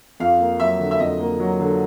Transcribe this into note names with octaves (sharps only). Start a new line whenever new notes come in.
F2 F5
A#3
F#3 E5
D3
E5
F2 D#5
A#3
F#3
D3